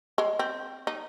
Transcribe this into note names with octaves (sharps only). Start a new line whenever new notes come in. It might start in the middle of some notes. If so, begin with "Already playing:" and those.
G#3
C4
D#4